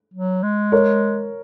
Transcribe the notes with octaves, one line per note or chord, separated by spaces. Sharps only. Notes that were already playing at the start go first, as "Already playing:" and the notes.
F#3
G#3
A#4 C#5